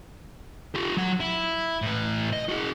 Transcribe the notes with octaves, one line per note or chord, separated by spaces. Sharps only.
F4 G4
F#3 F#5
E4
A2 B4
D#5
F#4 G#4